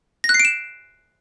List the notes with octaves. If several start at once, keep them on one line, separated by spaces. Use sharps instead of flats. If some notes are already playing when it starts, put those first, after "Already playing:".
A#6
F#6
C7
D7
E7